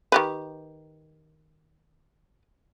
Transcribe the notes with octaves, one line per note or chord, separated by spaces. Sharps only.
D#3 G4 B4